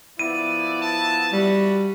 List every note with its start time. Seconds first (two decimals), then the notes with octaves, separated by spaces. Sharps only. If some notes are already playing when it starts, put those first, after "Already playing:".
0.19 F3 B3 E4 D5 D#7
0.82 A5
1.33 G3 F#4